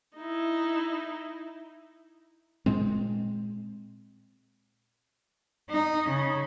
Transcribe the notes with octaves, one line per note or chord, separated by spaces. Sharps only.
D#4 E4
A#2 G#3 C4
D#4
C#3